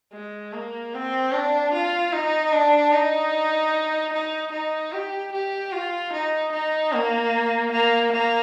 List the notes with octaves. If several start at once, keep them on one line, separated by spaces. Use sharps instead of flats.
G#3
A#3
C4
D4
F4
D#4
D4
D#4
D#4
D#4
G4
G4
F4
D#4
D#4
A#3
A#3
A#3